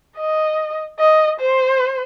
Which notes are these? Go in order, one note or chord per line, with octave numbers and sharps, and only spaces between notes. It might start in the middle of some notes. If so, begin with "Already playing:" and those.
D#5
D#5
C5